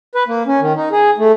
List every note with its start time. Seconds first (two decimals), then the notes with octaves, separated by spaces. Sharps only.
0.15 B4
0.28 A#3
0.47 C#4
0.61 D#3
0.76 D#4
0.92 G#4
1.18 A3